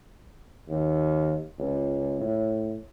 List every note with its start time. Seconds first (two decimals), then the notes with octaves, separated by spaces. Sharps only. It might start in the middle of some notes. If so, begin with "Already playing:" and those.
0.68 D#2
1.59 C#2
2.20 A2